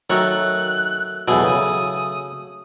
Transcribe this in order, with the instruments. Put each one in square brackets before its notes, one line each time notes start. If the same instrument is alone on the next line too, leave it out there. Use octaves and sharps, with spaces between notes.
[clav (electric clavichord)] D#3 A#4 [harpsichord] F#3 A3 C#5 [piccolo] F#6
[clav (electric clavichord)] E2 B2 [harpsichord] F#3 A3 G#4
[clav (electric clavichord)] C#3 [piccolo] D#6